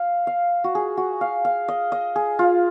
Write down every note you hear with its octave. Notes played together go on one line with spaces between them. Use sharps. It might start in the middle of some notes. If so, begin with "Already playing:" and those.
Already playing: F5
F5
F#4
G#4
F#4
F5
F5
D#5
D#5
G#4
F4